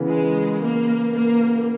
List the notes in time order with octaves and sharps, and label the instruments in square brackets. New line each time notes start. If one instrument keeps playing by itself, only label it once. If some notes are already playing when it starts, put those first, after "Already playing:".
Already playing: [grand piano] C#3 E3 B3 E4 A#4
[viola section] G#3
A#3
A#3